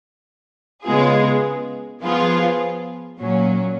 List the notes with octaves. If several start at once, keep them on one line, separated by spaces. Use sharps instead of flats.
C#3 G#3 B3 F4 G#4
F3 B3 F4 G#4
A#2 F#3 C#4